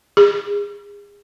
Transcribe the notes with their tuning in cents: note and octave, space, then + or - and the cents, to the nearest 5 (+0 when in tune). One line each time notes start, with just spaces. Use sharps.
G#4 -30